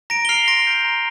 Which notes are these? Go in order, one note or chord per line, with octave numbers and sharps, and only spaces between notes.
A#5 A#6 D7
G7
F6 C7 F7
C6 A#6 D7
G6
A#5